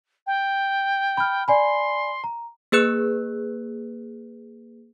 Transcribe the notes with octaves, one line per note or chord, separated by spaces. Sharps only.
G5
B5 F6
D5 G#5 B5 C6
A#5
A#3 G#4 B4 F#6